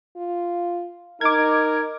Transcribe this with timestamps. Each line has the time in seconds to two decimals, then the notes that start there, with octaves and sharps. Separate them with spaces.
0.16 F4
1.21 D#4 A#4 D6 G#6